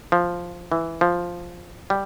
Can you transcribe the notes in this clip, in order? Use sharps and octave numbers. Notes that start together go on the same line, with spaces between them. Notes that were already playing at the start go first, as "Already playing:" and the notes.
F3
E3
F3
G3